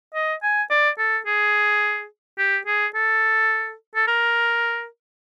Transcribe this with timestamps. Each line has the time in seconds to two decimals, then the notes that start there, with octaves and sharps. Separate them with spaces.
0.15 D#5
0.43 G#5
0.70 D5
0.98 A4
1.27 G#4
2.39 G4
2.67 G#4
2.95 A4
3.95 A4
4.07 A#4